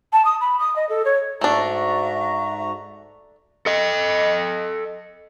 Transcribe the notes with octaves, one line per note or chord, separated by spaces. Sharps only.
A5
D#6
B5
D#6
D#5
A4
C#5
G#2 A3 D4 F#4 E5 A#5
A4 D#5